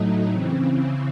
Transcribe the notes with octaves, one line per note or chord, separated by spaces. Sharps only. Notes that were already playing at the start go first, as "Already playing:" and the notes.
Already playing: A2 F#3 A3 D#4
C#3 E3 C4